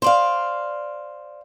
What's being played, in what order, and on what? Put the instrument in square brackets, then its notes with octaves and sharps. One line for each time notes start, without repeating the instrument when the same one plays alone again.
[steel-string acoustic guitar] C5 D5 F5